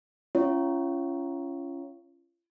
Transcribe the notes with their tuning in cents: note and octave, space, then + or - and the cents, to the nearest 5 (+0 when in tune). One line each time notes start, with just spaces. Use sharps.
C#4 +0 F4 -40 C#5 +0